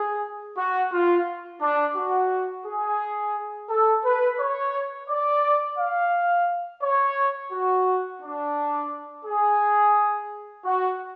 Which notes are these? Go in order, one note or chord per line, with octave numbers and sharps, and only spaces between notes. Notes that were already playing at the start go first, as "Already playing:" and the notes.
Already playing: G#4
F#4
F4
D4
F#4
G#4
A4
B4
C#5
D5
F5
C#5
F#4
D4
G#4
F#4